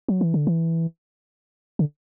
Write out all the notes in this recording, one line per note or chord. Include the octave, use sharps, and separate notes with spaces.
F#3
E3
D3
E3
D3